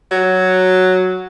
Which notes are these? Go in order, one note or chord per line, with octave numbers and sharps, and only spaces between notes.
F#3